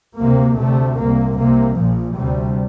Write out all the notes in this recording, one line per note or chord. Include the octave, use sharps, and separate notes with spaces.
D2 C3 A#3
D2 C3 A3
C2 C3 A#3
C2 C3 A#3
A#1 A#2 F3
D2 C3 G3